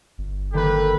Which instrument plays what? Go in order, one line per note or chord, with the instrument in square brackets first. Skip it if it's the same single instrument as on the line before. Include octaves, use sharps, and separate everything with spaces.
[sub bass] G1
[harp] D3 D#3 A#3 [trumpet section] G4 B4 [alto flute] A4